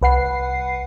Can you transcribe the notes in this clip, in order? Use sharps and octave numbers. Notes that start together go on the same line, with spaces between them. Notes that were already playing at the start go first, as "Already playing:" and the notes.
C2 B4 F#5 C7